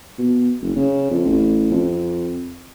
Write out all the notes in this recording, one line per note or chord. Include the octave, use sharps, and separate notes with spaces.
B2
F#1
C#3
F2
A1
F2